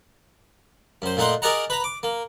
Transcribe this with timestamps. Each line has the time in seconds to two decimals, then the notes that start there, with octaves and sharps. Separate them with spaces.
1.02 F#2 C5
1.17 A#2 A3 D#4 F#5 C6
1.42 G#4 A#4 D5 D#5 F#5 A#5
1.70 B4 A#5
1.84 D6
2.03 A#3